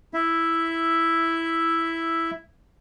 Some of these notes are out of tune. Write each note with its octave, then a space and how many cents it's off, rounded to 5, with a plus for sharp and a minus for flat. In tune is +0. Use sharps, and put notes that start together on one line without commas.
E4 +0 E5 +0